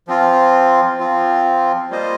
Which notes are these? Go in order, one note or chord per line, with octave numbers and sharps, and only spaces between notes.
F3 C4 F4
F3 C4 F4
G3 A#3 F4 C5 D#5